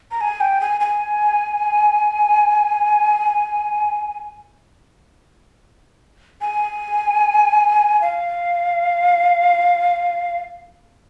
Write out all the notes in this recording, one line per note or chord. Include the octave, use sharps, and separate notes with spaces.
A#5
G#5
G5
G#5
G#5
G#5
F5